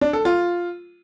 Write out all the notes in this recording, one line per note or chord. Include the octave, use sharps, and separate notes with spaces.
D4
A4
F4